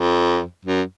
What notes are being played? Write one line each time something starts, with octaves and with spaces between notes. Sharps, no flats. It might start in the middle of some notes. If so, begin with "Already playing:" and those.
Already playing: F2
F#2